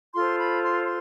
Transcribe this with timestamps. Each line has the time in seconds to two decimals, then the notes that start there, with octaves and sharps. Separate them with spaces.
0.14 F4 A4 C5 C6
0.38 B5
0.62 C6
0.85 C6